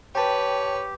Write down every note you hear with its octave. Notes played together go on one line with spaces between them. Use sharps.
G4 B4 C#5 G5 A5